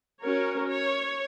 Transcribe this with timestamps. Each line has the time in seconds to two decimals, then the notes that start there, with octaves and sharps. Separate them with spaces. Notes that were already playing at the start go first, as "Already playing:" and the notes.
0.21 C#4 F#4 A#4 C#5
0.68 C#5